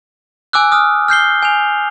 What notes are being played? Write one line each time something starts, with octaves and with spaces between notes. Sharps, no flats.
G#5 D6 E6 F#6
D#6 F6
F6 G6 C7 G7
G#5 F7